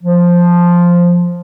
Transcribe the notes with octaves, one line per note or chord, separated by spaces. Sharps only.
F3